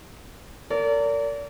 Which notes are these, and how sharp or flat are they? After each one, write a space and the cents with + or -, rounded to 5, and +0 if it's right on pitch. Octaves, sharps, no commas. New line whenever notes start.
A#4 -35 D5 -35